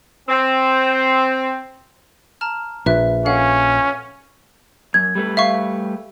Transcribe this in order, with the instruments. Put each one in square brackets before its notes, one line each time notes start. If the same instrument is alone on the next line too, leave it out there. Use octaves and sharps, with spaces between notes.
[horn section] C4
[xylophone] A5 A#5 F6
[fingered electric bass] A#1 [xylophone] B4 E5 F#6
[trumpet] C#4 [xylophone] A4 F5 F#5
[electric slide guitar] F#2 [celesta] G#6
[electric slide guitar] G3 A3 B4
[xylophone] E5 F5 C#6